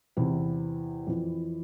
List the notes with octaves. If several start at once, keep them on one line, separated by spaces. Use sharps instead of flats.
E2 C3 E3 E4
F2 E3